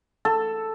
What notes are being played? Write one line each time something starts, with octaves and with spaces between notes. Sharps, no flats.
A4